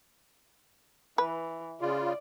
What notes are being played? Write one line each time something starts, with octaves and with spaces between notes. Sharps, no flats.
E3 B4
C#3 F4 D5